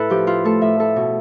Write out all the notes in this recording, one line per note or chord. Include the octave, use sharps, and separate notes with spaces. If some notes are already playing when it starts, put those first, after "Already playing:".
Already playing: A2 E4 A4 B4
F3 G4
E4 F4
A3 A4
A2 E5
E4 A4
B2